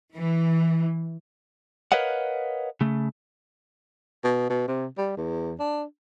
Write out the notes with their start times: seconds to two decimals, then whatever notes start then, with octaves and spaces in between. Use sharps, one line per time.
0.15 E3
1.92 A#4 B4 C#5 D#5 F5 F#5
2.81 C#3 A3
4.24 B2
4.50 B2
4.68 C3
4.98 G3
5.17 E2
5.59 D4